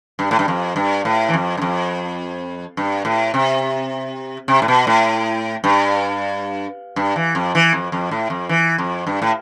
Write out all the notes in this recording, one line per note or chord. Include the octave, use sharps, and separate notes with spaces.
G2
A2
G2
F2
G2
A2
E3
F2
G2
F2
G2
A2
C3
C3
A2
B2
A2
G2
G2
E3
F2
E3
F2
F2
A2
F2
E3
F2
G2
A2